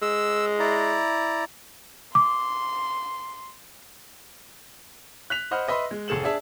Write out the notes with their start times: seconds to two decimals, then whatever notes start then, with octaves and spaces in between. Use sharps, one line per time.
0.02 G#3 E6
0.60 E4 D5 A#5
2.15 C6 D6
5.30 F#6 B6 F7
5.51 C5 D#5 F#5 B5 F6
5.68 B4 D#5 E5 B5 C6
5.91 G#3
6.08 F1 G#4 A4 E7 F#7
6.23 D4 G#4 E5 A5